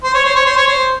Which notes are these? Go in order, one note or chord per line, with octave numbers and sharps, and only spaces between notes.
C5
C#5
C5
C#5
C5
C#5
C5